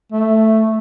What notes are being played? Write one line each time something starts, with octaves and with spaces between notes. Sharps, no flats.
A3